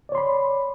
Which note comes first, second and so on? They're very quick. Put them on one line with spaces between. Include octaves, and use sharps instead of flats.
D5 C#5 C6 B5